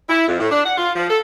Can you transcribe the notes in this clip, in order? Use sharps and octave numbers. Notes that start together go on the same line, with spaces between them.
E4
F2
A2
D4
F#5
F4
F3
A4